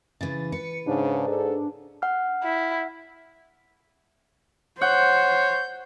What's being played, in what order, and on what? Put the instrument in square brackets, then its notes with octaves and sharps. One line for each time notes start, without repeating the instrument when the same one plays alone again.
[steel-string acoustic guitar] C#3 E3 [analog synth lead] A6
[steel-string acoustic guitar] B4 [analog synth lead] C#7
[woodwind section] G#2 [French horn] C#3 [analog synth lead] D4
[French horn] A4
[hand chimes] F#5 F6
[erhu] E4
[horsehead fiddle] C5 [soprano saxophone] C#5 [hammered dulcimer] F#5 [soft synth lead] G6